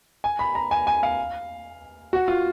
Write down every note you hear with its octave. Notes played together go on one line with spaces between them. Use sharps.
G#5
B5
A#5
G#5
G#5
F5
F#4
F4